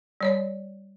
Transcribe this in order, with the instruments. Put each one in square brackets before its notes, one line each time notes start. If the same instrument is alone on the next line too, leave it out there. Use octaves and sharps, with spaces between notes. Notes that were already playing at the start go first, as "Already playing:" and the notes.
[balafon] G3 C#5 D5